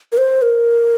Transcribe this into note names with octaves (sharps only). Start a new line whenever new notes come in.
A#4
C5
A#4